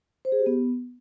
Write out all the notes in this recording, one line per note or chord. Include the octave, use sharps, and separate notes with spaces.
C5
G#4
G4
B3